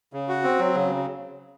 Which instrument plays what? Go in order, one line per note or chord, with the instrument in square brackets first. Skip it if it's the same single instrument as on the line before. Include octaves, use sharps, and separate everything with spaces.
[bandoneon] C#3
F#4
C4
F#3
C#3